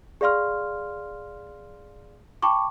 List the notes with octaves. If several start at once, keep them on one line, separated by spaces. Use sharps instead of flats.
G#4 D5 F5 C6 F6
G5 A5 B5 C#6 D6